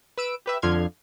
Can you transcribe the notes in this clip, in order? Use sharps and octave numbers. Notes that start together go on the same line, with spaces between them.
B4 E6 D7
G4 B4 E5
F2 D3 F3 C6 F6 G#6